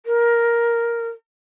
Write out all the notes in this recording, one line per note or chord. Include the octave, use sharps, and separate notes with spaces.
A#4